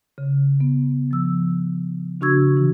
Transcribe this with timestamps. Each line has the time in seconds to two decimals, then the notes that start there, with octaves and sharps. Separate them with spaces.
0.18 C#3
0.60 B3
1.11 F3 E6
2.21 C#3 D4 F#4 C#6 E6 G#6
2.57 C3 E3